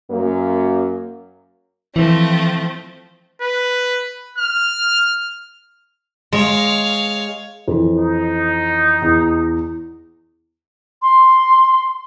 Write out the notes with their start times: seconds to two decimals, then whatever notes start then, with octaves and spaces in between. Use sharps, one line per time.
0.10 F#2 A#3
1.96 E3 F3 A3 C4
3.42 B4
4.38 F6
6.33 G#3 C#5 F5
7.68 F2 E3
7.98 D#4
9.02 E2
11.02 C6